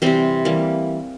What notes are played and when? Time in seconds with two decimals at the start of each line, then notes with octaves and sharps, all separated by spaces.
0.02 C3 E3 G3 C4 C5
0.45 E3 G3 A#3